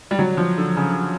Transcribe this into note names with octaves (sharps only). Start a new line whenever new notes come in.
G3
F#3
F3
D3
C#3